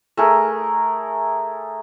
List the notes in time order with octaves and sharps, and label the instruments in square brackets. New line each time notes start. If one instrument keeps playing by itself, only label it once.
[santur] A3 G#4 A#4